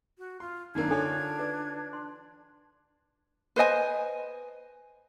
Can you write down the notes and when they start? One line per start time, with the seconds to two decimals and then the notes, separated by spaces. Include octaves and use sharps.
0.18 F#4
0.40 F4 C6
0.75 G#1 F#2 A#3 D4 D#4 A#4 G#6
0.90 D3 F4 A4 C#5 G#5
1.39 B4 D5
1.93 C6
3.56 B4 C5 D#5 G#5